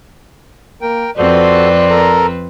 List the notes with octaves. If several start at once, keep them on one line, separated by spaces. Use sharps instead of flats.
A#3 A#4 G5
F2 C4 F#4 A4 B4 C5 D5
A4 A#4 A#5